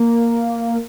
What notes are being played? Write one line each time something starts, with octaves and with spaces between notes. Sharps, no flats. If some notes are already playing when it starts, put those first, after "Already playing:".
Already playing: A#3